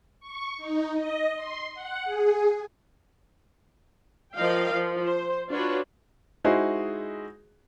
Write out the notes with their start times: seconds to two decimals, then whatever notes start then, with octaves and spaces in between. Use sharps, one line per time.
0.20 C#6
0.58 D#4
0.94 D#5
1.36 C6
1.75 F#5
2.05 G#4
4.35 F3 A#4 D5 D#5 F5 G5
4.72 F3
5.03 C5
5.51 D4 F4 F#4 B4 C#5
6.44 G#3 D#4 E4 F#4 G#4 C5